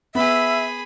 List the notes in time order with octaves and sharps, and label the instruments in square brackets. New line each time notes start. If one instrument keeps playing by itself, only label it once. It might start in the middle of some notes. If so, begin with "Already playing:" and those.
[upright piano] B3 [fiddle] G#4 B5 [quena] E5